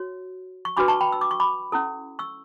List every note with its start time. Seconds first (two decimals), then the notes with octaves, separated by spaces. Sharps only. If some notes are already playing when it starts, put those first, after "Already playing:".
Already playing: F#4 C#5
0.65 C#6
0.77 D4 F#4 B4 B5 D6
0.88 A5 C#6
1.01 G5 B5
1.12 E6
1.21 D6
1.31 C#6
1.40 B5 D6
1.72 C#4 E4 A4
2.19 C#6 E6